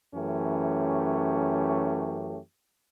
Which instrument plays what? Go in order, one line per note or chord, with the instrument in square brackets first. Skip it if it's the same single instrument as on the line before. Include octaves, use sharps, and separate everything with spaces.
[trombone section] F#2 E3 A3 C#4 G4